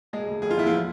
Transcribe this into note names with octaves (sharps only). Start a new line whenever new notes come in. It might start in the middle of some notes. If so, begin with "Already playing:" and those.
E1 G#3 G#4
D2
F1 G#4
F4
E2 E4
F3 F4